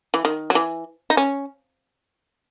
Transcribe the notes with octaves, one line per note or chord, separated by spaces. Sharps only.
E3
D#3
F#3
E3
D#4
C#4